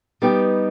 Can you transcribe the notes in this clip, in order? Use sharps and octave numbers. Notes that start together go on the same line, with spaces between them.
G3 B3 D#4 G4